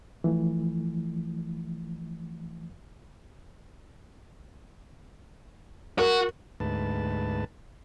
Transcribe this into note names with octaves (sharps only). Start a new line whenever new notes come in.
E3 F3 A3
F#4 A#4
D2 G#2 B4 A5